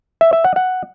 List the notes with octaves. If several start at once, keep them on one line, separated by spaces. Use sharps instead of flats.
E5
E5
F#5
F#5